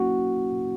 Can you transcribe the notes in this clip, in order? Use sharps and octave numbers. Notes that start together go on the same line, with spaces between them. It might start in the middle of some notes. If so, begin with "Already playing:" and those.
Already playing: F#3 A#3 C#4 E4 F#4